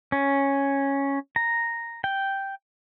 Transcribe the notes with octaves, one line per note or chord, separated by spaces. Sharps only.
C#4
A#5
G5